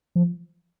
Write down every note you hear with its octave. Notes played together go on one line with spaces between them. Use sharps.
F3